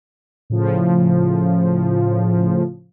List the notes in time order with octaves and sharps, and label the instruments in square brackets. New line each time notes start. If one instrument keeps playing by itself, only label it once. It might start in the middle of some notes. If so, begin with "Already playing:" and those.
[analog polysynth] A2 C#3 F3